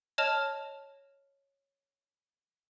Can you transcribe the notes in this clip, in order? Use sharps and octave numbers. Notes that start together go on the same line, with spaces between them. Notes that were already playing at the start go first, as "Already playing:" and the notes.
C#5 D#5 A5 F6 E7 F7